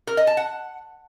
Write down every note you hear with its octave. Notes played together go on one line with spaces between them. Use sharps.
A#4
D#5
A5
F#5